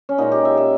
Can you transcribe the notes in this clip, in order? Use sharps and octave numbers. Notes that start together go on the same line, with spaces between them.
C#4
A#2 G#3 D#4
G4
E5
E5